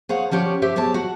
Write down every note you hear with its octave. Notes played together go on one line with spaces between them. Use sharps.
G#4 C5 C#5 F5 F#5
F3 C#4 G4 C#5 D5
G4 C5 E5
B2 G4 G#4 C#5 A5
F#4 F#5